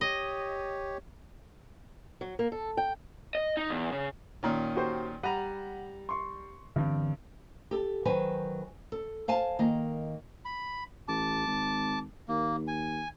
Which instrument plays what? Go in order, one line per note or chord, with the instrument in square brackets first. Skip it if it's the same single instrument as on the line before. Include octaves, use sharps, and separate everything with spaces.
[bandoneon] G4 C#5 [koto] D#5
[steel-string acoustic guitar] F#3
A#3
A4
G5
[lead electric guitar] D#5
D#4
E2
C#3
[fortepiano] A#2 D#3 C#4
[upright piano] F#4 G4 C5
[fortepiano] G3 A#5 [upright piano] F#5 B5 D#7
[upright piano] C6 C#6
[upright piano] G2 [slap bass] D3 E3 C4
[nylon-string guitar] G4 A4
D#3 F#3 B4 C5 G#5
A4
C5 F5 G#5 A5
D#3 A#3 D#5
[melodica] B5
[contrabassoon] A1 [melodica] A5 D6
[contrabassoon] G#1
[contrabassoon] D#2 [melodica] A#3
[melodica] G#5